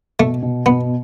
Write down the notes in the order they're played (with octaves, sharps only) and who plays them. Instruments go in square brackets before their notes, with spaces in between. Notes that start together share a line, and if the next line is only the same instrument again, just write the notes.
[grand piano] B2 [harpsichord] A3
[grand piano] B2
[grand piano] B2 [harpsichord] B3